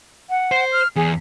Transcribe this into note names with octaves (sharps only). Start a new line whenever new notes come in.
F#5
C5
F6
E2 G#4